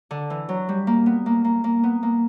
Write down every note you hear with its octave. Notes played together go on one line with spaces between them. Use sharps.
D3
E3
F#3
G3
A#3
B3
A#3
A#3
A#3
B3
A#3